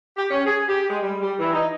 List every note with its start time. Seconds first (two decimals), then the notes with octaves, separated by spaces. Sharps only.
0.17 G4
0.31 C#4
0.46 G#4
0.67 G4
0.90 G#3
1.02 G3
1.21 G3
1.39 E3
1.52 D#4